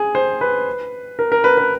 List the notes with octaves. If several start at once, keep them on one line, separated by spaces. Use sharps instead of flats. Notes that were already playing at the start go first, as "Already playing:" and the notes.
Already playing: G#4
C5
B4
A#4
A#4
B4
B4